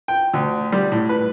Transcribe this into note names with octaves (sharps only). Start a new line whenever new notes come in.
G5
D2
G3
A2
B4